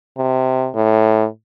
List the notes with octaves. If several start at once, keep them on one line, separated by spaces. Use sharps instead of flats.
C3
A2